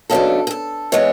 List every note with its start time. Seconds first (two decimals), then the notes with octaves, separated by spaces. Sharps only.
0.10 D#2 C#3 F#3 B3 D4 A4
0.47 G#4
0.51 A4
0.92 E3 G#3 B3 C#5